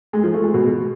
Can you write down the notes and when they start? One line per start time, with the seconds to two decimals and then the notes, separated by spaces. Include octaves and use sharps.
0.13 G#3
0.23 F3
0.34 A3
0.44 G#3
0.54 B2